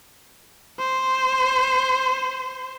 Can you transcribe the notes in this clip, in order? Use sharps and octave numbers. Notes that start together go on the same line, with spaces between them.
C5